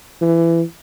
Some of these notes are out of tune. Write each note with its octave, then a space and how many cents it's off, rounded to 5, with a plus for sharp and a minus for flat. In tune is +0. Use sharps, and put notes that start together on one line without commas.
E3 +20